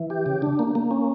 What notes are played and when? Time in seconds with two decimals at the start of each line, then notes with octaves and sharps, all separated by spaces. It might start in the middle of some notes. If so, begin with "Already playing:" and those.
Already playing: E3
0.10 G4
0.26 C#3
0.42 D4
0.59 A#3
0.75 A#3
0.91 C#4